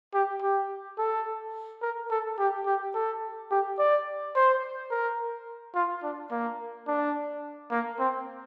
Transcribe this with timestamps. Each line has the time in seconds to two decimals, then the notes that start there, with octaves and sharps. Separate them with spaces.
0.14 G4
0.42 G4
0.98 A4
1.82 A#4
2.11 A4
2.39 G4
2.66 G4
2.95 A4
3.51 G4
3.79 D5
4.36 C5
4.91 A#4
5.75 F4
6.03 D4
6.31 A#3
6.88 D4
7.71 A#3
7.99 C4